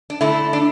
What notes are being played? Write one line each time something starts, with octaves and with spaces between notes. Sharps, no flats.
D4
D3 A3 E4
D4